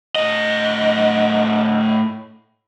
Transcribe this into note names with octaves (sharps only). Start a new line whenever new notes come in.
A2 D#5